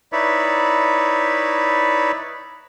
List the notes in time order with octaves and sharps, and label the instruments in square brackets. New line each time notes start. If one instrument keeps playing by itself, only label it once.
[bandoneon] D#4 E4 B4 C#5 D5 E5